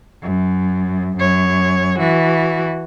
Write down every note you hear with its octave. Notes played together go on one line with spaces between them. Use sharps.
F#2
F#2 C#5
E3 F#4